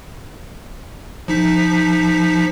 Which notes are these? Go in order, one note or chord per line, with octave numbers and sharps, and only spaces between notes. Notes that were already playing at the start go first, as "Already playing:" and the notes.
F3 D#4 B6